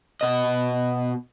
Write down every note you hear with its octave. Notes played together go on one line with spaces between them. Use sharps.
B2 D#5